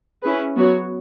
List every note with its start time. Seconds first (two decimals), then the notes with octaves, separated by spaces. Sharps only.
0.23 C#4 E4 G#4 B4
0.56 F#3 B3 F#4 C#5